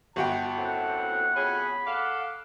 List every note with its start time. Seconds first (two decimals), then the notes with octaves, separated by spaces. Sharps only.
0.16 G1 F#4 G5 A5
0.58 F#2 A2 C4 F#5
1.36 F2 C#4 G#4 B5
1.87 A4 D5 F5 F#5